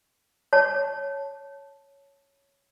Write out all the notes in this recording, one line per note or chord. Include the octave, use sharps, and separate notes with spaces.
C#5 A5